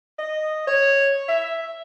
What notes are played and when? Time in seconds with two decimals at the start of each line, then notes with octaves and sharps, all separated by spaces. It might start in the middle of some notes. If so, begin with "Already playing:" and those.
0.19 D#5
0.67 C#5
1.28 E5